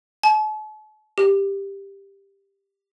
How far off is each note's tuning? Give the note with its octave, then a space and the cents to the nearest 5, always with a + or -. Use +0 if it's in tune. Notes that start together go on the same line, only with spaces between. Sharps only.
A5 -45
G4 +10